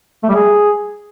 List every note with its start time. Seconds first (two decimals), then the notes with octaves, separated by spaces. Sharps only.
0.23 A3
0.29 G3
0.35 G#4